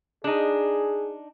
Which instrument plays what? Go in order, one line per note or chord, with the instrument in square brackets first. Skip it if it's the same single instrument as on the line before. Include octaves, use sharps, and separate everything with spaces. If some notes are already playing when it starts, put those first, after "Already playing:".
[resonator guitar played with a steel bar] D4 D#4 [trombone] G#4